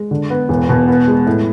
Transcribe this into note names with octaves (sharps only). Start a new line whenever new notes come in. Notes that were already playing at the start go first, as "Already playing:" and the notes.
Already playing: G#3
D3
B3
E1
B2
B3
G#3
A2